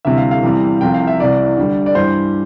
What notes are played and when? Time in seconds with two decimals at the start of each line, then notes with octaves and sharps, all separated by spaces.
0.05 D2 C3 E3 G3 E5
0.18 F5
0.31 F5
0.43 E2 C3 E3 G3
0.81 C2 C3 F3 G5
0.94 F5
1.07 E5
1.19 C2 C3 E3 G3 D5
1.57 D2 D3 G3
1.86 D5
1.95 G2 E3 G3 C5